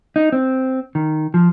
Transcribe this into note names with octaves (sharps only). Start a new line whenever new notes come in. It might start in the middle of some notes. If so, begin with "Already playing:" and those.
D#4
C4
D#3
F3